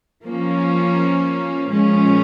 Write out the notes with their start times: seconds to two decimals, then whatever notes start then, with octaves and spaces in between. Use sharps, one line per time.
0.23 F3 A#3 C#4
1.68 A#2 F3 G#3 C#4